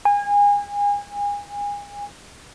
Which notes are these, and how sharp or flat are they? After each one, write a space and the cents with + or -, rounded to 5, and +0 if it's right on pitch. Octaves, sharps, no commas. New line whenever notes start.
G#5 -30